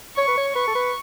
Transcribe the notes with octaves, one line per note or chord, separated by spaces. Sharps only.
C#5 C#6
B4
C#5
B4 C#6
A4
B4